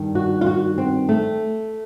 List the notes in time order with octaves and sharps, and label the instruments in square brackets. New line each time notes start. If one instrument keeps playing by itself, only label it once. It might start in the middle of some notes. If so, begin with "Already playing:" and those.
Already playing: [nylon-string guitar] G2 D#3 G3
F#4
F4
F#4
C4
A3